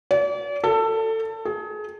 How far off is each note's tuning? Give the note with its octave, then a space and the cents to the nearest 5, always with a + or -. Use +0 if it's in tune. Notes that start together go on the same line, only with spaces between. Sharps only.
D5 -40
A4 +20
G#4 +30